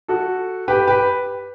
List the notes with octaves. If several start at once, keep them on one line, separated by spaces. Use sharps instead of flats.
F#4 A4
G4 B4
G4 B4